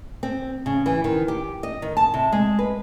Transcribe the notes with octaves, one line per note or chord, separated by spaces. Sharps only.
C4
C#3
E3
D#3
G4
D#5
D#3
A5
C3
G#3
B4